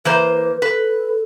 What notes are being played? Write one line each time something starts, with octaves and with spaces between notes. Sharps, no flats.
E3 A#3 B4 C5
A4 B4